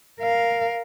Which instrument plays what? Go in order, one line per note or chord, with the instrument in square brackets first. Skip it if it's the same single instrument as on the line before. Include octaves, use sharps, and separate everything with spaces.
[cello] A#4 F5